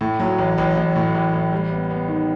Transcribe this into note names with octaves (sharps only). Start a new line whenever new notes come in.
A2
F#3
A1
A1
A1
A2
A1
A1
G3
B3
B3
D#3